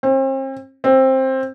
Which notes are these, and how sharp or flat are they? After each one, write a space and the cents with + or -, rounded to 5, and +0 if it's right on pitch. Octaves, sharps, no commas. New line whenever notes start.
C4 +40
C4 +15